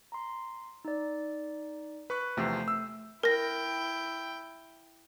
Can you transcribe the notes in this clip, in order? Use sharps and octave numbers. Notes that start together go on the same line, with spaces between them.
A#5 C6
D#4 D5
B4 C#6 F#6
E2 C3 F3 A3 G6 C7
E6
E4 A#4 G5 A#6